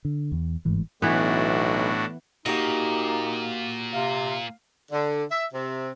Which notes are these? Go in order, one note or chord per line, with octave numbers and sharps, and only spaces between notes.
D3
E2
G1 G#2 E3 A3
B1 A2 E3 B3 D4 F#4
A#2 A#3 D#4 F#4 G4
C3 F5
D3
E5
C3